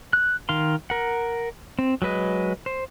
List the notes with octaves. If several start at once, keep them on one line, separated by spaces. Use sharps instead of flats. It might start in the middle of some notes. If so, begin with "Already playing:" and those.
F#6
D#3 F5 C6
A#4 F#5
C4
F#3 G#3 B4 D#5
C5